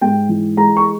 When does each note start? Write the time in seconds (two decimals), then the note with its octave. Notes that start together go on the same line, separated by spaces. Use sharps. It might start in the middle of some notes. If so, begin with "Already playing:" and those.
0.01 G#2 G5
0.29 E3
0.57 G#3 A#5
0.77 C#6